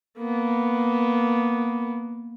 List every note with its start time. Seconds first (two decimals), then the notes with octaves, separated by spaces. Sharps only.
0.18 A#3 B3